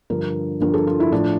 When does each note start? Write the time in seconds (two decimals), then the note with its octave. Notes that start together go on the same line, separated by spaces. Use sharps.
0.10 G2 D3 F3 A#4
0.60 G2 D3 F3 A#4
0.74 A4
0.87 F4
1.00 E4
1.12 A2 F3 D4